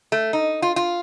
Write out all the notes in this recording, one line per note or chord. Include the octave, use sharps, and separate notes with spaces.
A3
D#4
F4
F4